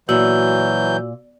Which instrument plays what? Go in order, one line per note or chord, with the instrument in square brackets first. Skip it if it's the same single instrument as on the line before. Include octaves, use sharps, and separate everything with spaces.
[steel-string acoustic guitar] A#2 [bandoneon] E3 F#3 G6 [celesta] F#4 E6 F#7